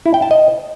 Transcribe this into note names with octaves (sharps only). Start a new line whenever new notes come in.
E4
G5
A5
D#5